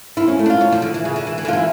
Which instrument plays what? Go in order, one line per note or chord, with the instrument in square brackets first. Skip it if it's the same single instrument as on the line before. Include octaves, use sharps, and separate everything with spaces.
[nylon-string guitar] E4 [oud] F4
[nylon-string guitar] C#4
A3
[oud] D4
[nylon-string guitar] F4
[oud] C#4
F3
D3
E3
C#3
D3
E3
E3
D3
[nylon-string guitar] F4
[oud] E3 [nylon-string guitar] E4